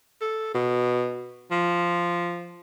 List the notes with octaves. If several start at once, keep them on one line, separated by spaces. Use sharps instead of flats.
A4
B2
F3